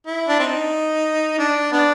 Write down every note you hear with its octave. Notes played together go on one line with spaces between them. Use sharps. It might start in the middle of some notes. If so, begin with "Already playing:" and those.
E4
D4
C4 D#4
D4
B3 D4